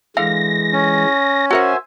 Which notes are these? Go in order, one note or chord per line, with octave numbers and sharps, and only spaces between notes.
D3 E3 G#3 F5 A#6
C#4
F#4 A#4 C5 E5 F#5 G#5